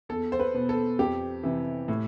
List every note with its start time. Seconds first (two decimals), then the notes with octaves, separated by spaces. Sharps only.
0.09 E2 A4
0.32 C5
0.39 B4
0.54 B2 B3
0.69 A4
0.99 F2 G4
1.43 C3 E3
1.88 A2